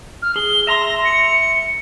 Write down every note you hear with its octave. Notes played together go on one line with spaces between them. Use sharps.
F6
G#4 G7
E5 A#5 C6 A#6
C#7